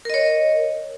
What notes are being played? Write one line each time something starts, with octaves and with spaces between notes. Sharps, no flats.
A#4 C#5 D#5